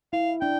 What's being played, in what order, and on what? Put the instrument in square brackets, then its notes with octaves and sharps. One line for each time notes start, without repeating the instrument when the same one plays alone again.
[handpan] E4 [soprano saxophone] F5
[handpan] D4 [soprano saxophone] G5